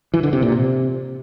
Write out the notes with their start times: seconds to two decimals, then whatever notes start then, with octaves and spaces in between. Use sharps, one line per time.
0.14 E3
0.23 D3
0.33 C3
0.42 A#2
0.52 C3